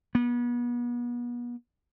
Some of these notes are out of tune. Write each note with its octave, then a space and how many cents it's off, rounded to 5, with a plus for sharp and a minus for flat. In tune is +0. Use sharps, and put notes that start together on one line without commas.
B3 -35